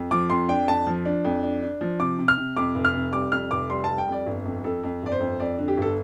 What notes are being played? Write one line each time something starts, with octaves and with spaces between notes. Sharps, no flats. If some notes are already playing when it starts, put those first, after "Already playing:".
Already playing: F2
F3 D6
F2 C6
D4 G5
F2 A5
F3
D4
F2
D4
D4
F3
C3 D6
C3
F6
C3
F2 D6
F1
F6
C3
G3 D6
F2 F6
F1 D6
G3 C6
G3 A5
G5
F2 D5
G1
F2
F2 A4
F2
G1 D5
C5
F2
F2 D5
D3
G4
G1 A4